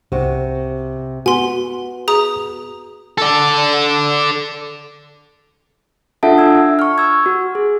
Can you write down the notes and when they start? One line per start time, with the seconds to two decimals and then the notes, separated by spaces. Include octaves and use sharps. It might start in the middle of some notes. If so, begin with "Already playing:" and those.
0.12 C2 C3 F#4
1.26 B3 F#4 G#5 C6
2.08 G#4 A#5 D#6
3.18 A4 D5
6.23 D4 F4 A4 E5 F#5 A5
6.38 D4 E6 G#6
6.79 C#6 F6
6.98 E6 G#6
7.26 F#4
7.55 G#4